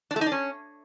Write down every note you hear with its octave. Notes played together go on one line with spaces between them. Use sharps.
D4
A3
D#4
D4
C#4